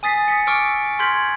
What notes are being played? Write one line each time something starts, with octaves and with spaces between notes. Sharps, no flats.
G#5 D#6 A6 B6 C7
D#6 B6 C#7
C#6 D6 E6 F6 D7
C6 F6 G6 G#6 B6 F#7